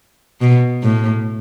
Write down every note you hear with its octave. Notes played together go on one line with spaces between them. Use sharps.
B2
A2